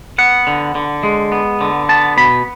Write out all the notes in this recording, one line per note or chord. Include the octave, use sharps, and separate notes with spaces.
B3 F#5
D3
D3
G#3
B3
D3
B3 A5
B2 B5